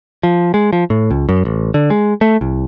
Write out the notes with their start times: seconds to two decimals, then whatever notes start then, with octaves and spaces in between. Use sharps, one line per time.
0.23 F3
0.54 G#3
0.73 F3
0.90 A2
1.10 C#2
1.29 F#2
1.45 A1
1.74 D3
1.90 G#3
2.21 A3
2.41 C2